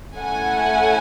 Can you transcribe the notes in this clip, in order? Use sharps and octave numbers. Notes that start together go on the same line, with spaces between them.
A3 C#4 E4 A4 F#5 G#5